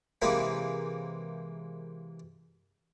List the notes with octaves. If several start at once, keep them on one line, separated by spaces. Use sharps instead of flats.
C3 E3 G#3 A#3 C4 B5